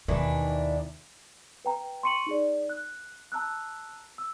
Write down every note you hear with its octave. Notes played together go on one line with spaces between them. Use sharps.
D#2 B2 D#3 E3 D4
B4 G5 A#5
C6 C#6 C#7 D#7 F#7
D#4 G#4 D5
F#6
A5 A#5 E6 F#6
E6